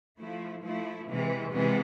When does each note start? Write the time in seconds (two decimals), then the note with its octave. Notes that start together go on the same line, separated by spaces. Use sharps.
0.19 F3 A3 E4
0.63 F3 A3 E4
1.07 C3 E3 G#3
1.52 C3 E3 G#3 B3